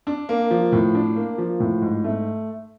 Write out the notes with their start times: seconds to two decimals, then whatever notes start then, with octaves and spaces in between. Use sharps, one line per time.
0.07 D4
0.29 A#3
0.51 F3
0.72 A2
0.95 D4
1.16 A#3
1.38 F3
1.60 A2
1.82 G#2
2.04 A3